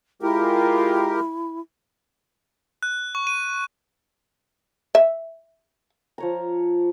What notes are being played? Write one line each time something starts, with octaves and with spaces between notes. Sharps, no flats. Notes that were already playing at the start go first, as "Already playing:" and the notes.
G#3 E4 F4 G4 A#4
F#6
C#6
D#7
E5
F3 C#5 A#5